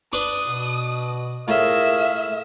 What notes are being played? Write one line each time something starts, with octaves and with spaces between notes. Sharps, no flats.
D4 B4 D6 D#6
B2
A2 F4 G#4 A#4 E5 F5